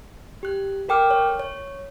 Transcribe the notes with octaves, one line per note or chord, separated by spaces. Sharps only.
G4 F#6
A4 A#4 G5 D6 F6
C#5
C#5